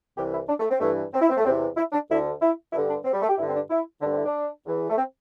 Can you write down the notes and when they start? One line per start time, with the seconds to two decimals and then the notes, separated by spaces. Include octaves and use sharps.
0.17 C2 C3 E3 G4
0.32 E4
0.48 D4
0.60 A3
0.71 C4
0.80 G2 E3 A3
1.13 C4
1.21 E4
1.29 C4
1.37 A3
1.44 E2 C4
1.48 C3 E3
1.77 E4
1.93 D4
2.09 D2 D3 E4
2.41 E4
2.73 G2 D3 E4
2.89 D4
3.05 C4
3.13 G3
3.22 A3
3.29 G4
3.37 G2 D3 E4
3.48 C4
3.54 D4
3.70 E4
4.01 D3 D4
4.05 G2 C4
4.17 E4
4.25 D4
4.66 E2 E3
4.90 A3
4.97 C4